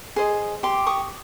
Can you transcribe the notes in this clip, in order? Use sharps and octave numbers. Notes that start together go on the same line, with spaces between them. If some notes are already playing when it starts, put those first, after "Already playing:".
G#4 C5 D#5
G4 C6 D6
C#6 D#6